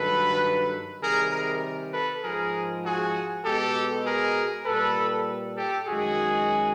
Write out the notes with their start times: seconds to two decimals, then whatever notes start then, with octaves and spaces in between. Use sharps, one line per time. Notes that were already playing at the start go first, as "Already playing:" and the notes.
Already playing: G2 D#3 F#3 A4 B4
1.01 C3 D#3 G3 G#4 A#4
1.31 G#4 A#4
1.92 A4 B4
2.23 G#2 F3 G#3 G#4 A#4
2.84 F#4 G#4
3.44 B2 G#3 G4 A4
4.05 G#4 A#4
4.65 A#2 G3 A4 B4
5.57 G4 A4
5.87 F#2 D#3 G#3 F#4 G#4